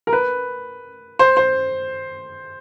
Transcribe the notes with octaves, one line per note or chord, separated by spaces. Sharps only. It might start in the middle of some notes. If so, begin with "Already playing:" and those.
A#4
B4
C5
C5